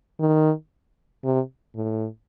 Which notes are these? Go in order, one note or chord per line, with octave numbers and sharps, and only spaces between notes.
D#3
C3
A2